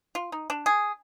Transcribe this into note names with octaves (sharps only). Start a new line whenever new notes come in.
F4
D#4
D4
G#4